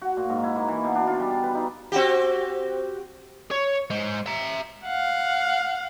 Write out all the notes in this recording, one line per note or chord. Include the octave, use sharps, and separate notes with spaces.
F#4
A#2
G#2
E4
A#3
E3
B2
D4
F4
G3
B4
D#4
C4 F#4 G4
C#5
G#3 C5
E5 A#5
F5 F#5